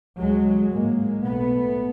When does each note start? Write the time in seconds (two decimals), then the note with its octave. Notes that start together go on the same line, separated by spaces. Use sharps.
0.19 D2 C3 F#3 G#3
0.72 A1 G#2 G#3 A#3
1.24 B1 B2 A3 B3